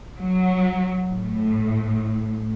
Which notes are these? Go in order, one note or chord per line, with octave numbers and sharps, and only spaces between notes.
F#3
A2